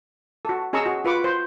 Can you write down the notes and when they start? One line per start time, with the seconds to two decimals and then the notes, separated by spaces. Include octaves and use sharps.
0.45 F#4 A4
0.73 C#4 G#4 D#5 A#5 C#6 E6
0.86 C#4 F#4
1.04 F4 B4 C#6 D6
1.24 C5